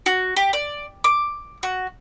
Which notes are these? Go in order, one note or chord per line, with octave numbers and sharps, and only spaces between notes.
F#4
G4
D5
D6
F#4